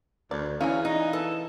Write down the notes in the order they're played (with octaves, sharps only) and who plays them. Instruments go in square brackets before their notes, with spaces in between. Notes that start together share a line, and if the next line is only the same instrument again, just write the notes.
[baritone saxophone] D2 [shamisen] D5
[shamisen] C#3 G#3 F5 [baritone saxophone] E3 [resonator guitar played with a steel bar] C#4
[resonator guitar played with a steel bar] D#4
[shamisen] B3 [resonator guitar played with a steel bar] A4